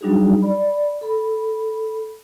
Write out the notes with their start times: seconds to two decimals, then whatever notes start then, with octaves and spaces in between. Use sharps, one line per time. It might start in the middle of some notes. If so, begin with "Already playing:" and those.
0.01 F#3 G3 D4 D#4 F#4 G#4
0.42 D5 B5
1.01 A4 B5